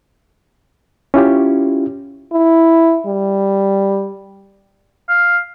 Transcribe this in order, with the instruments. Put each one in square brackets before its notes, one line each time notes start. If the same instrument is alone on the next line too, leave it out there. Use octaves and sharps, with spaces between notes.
[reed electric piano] C#4 E4 F4 G4
[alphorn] E4
G3
[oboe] F5